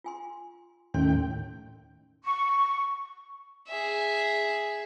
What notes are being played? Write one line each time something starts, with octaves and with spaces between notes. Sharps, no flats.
F4 G#5 C6
D#2 A2 C#4 G5 C6
C#6
G#4 E5